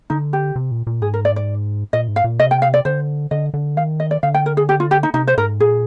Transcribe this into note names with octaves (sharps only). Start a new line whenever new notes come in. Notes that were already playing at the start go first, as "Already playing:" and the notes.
D3 D#4
G4
C3
A#2
A#2
G#2 G#4
A#4
D5
D5
A#2 D#5
G#2
F5
A#2
C3 D#5
G5
F5
D5
D3 C5
D3 D#5
D3
D#3 F5
D#5
D5
D3 F5
G5
A#4
G#4
G4
F4
G4
D#4
C3 D#4
C5
G#2 A#4
A#2 G#4